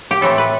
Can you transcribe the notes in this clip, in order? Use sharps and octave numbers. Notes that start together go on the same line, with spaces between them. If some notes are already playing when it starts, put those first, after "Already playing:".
G4
A2 E3 A3 C4 A4
B4